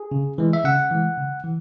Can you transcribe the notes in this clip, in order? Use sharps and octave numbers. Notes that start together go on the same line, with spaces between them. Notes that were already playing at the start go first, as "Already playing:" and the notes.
Already playing: G#4
C#3
E3 G#3
E5
C#3 F#5
E3 G#3
C#3
E3